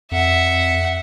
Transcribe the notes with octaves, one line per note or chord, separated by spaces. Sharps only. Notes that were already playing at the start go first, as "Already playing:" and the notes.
F2 E5 F#5